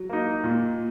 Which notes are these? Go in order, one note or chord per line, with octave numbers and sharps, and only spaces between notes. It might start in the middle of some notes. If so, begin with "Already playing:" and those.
Already playing: F#3
A#3 D#4
A#2